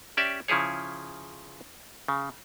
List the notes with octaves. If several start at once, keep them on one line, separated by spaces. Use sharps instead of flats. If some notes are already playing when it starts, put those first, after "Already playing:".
C#4 G4 D5 E5
C#3 F3 E4 G#4 C#5
C#3